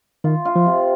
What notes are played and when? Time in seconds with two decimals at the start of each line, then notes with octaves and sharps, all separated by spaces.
0.24 D#3 F4
0.45 F4
0.56 F3
0.66 C3